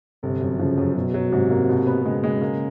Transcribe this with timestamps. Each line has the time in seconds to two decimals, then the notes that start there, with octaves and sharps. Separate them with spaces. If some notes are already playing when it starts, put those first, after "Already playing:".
0.23 G1 C3
0.41 F#2
0.59 C#3 F3
0.78 F#2
0.95 B2 F#3
1.14 F#3
1.32 G#2 C3
1.51 A#3
1.69 B2
1.87 B3
2.05 C#3 G#3
2.24 G#3
2.41 A#3